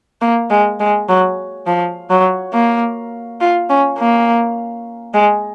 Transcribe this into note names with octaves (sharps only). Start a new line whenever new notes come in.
A#3
G#3
G#3
F#3
F3
F#3
A#3
F4
C#4
A#3
G#3